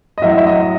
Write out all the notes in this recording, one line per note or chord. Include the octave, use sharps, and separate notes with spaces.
D#5
A2 F#3 E5
E5
D#5